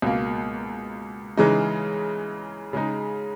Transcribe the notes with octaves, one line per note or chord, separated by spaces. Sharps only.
C#2 B2 A#3
C#3 E3 G#3 D#4
C#3 G#3 D#4